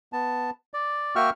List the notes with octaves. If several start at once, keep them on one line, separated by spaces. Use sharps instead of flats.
B3 A5
D5
A#3 F#4 E5 G5 C#6 F6